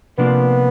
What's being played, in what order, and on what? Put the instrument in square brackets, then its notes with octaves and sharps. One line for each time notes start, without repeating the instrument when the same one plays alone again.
[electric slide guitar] C3 F3 A#3 D4 F4 [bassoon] B3